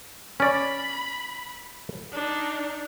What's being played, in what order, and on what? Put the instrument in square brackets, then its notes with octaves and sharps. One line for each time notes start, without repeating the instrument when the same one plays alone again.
[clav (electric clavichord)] C#4 D5 [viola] B5
[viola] D4 D#4